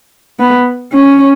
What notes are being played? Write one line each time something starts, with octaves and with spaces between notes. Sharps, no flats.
B3
C#4